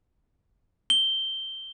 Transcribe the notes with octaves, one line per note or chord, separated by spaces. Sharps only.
G7